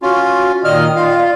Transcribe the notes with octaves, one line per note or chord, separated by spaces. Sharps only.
C#4 F4 F#4
A#2 D#3 D5 D#5 F6
F4 F5